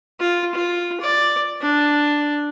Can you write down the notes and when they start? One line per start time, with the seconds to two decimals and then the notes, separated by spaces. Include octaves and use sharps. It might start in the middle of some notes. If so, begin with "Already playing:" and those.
0.20 F4
0.55 F4
1.01 D5
1.61 D4